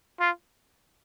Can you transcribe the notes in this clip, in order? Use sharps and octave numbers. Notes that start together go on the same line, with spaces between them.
F4